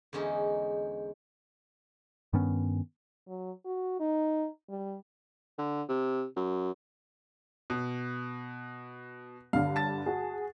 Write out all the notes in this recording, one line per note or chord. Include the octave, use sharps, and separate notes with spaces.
E2 D3 G#3 C#4 D#4
G2 D#3 B3 C#4
F#3
F#4
D#4
G3
D3
C3
F#2
B2
G2 D3 F5
A5 A6
F#4 G#4